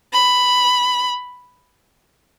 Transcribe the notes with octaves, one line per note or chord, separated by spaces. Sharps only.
B5